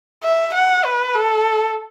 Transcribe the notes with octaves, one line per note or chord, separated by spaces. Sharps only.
E5
F#5
B4
A4